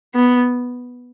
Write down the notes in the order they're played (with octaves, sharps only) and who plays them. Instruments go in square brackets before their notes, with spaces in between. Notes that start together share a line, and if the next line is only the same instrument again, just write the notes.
[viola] B3